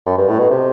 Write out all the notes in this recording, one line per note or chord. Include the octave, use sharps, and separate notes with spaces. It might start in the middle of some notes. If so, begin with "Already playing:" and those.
F#2
G2
A2
B2
C3